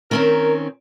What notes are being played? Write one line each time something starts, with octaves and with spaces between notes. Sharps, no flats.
D#3 C4 C#4 A#4